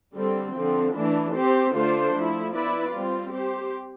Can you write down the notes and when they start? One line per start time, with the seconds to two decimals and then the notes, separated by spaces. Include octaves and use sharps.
0.15 D3 G3 C4
0.55 D3 F3 C4
0.95 E3 A3 D4
1.34 C4 G4 C5
1.74 D3 A3 D4 F4 C5
2.14 F3 A3 E4
2.54 B3 E4 B4 D5
2.94 G3 C4 F4
3.33 C4 G4 C5